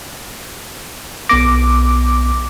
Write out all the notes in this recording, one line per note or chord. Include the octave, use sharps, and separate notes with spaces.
B1 B3 D6 A#6